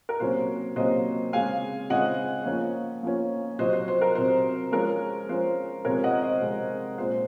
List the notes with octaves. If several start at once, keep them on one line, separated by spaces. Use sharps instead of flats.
A#4
C3 F#3 A#3 C#4 C5
C3 F#3 A#3 C#4 C5 D#5
C#3 G#3 C4 F5 G#5
C#3 G#3 C4 D#5 F#5
F3 A#3 C#4
F3 A#3 C#4
C3 F#3 C4 C5 D#5
C5
C5
A#4
C3 F#3 C4 C5
F3 G#3 C#4 A#4
F3 G#3 C#4 C5
C3 F3 G#3 C4 A#4 C#5
D#5 F#5
C5 D#5
C3 F3 G#3 C4
A#2 G#3 C4 C5